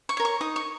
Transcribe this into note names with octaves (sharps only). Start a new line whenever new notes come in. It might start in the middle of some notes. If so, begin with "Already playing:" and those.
C#6
A#4 C#5
C#6
D#4 D#6
C#6